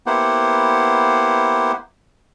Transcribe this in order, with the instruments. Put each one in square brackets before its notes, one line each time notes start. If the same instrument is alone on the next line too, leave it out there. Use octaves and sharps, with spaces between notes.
[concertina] A#3 B3 E4 G4 C5 F#5